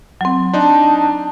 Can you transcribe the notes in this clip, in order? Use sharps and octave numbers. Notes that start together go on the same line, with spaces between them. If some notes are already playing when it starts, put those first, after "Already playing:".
F#3 C4
D4 D#4 A5